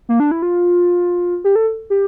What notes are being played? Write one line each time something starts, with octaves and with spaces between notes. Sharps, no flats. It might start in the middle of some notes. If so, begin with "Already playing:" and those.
A#3
D4
E4
F4
G4
A4
G4